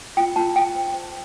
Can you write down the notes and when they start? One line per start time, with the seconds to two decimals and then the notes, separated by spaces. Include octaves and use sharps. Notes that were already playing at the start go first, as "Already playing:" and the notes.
0.17 F4 G5
0.36 F4 A5
0.56 F4 G5
0.75 C5
0.94 C5